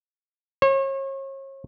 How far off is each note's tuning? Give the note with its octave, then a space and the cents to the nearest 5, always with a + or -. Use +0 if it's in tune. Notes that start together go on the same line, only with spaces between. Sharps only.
C#5 -35